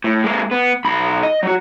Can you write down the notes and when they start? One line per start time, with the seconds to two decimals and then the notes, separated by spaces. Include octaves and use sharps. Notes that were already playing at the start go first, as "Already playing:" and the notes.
0.04 A2
0.24 G#3 A#3
0.51 B3
0.85 B1 B5
1.23 D#5
1.43 F#3 F#4